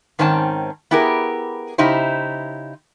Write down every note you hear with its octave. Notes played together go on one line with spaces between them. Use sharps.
G#2 D#3 C4 C#4 G#5 A5
B3 E4 G4 G#4 A#4
C#3 D#4 E4 G4 C5